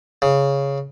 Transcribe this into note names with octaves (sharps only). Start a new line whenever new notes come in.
C#3